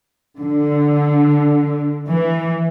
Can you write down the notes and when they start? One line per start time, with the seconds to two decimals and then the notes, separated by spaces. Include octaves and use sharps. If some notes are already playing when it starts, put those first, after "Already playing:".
0.39 D3
2.08 E3